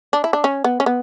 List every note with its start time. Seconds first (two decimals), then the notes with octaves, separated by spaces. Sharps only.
0.13 D4
0.24 E4
0.33 D4
0.44 C#4
0.64 B3
0.80 C#4
0.86 B3